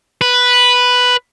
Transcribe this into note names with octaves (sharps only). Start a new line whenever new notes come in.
B4